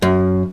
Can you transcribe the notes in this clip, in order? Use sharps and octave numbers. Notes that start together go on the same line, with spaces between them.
F#2